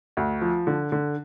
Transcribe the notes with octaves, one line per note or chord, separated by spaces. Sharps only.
D2
F3
D3
D3